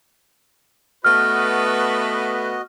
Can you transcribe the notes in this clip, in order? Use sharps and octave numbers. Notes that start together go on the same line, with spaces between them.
A3 B3 F#4 B4 D#5 F6